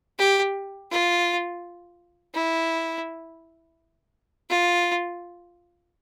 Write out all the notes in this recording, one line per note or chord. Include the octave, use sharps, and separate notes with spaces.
G4
F4
E4
F4